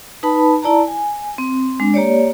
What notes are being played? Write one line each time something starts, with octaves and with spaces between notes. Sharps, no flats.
D#4 B4 A5 B5
E4 D5 A5 A#5
G#5
C4
G#3 D4
A#3 G4 C#5 D5